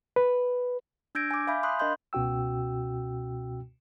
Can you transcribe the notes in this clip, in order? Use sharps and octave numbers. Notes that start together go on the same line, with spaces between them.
B4
D4 E6 G6 G#6 A#6 D7
G#5 D6
E5 F5 G#5 B5 G6
B5 C6 D#6 F#6
D4 A#4 D#5 F5 C6 G6
C#2 B2 C#4 F#4 G5 E6